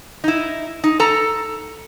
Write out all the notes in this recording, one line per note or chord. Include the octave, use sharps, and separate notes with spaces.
D#4 E4
D#4
A4 A#5